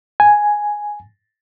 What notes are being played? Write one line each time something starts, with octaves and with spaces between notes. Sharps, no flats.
G#5